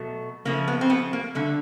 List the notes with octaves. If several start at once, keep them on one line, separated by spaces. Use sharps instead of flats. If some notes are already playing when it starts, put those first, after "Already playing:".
Already playing: B2 F#3 A3
C#3 F3 A3 A#3
B3
C4
B3
A#3
D3 G3 A3